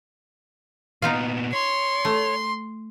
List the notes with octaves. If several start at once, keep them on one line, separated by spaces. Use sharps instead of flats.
A#2 B3 D#4 F4 F5
C#5 C6
A3